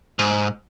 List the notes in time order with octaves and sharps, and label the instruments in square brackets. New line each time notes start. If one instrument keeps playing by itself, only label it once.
[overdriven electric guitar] G#2